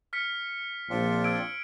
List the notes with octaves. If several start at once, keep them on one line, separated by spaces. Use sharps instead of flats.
F6 B6 C#7
A#1 C4 D4 F4
E6 G#6 D7